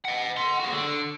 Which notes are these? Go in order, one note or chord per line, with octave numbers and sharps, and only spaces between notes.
D#5 F#5
F#5 C6
F#4 G#4
D3